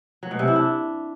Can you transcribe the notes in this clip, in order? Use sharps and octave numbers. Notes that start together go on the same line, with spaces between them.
F#3
B2
C3
E4
D4